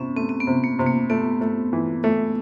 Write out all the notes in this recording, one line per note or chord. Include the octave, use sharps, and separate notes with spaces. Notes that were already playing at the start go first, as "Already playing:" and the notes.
Already playing: C3 B3 C#4
A3 C4
C4
B3
C3
A#3
C3
A#3
A3 B3
A3
E3
A3